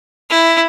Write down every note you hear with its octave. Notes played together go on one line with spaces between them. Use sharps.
E4